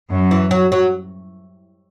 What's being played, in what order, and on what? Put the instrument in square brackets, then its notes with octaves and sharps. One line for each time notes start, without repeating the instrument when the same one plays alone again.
[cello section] F#2
[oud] E3
F#3
F#3